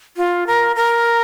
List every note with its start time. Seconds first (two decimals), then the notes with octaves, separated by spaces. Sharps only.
0.17 F4
0.47 A#4
0.76 A#4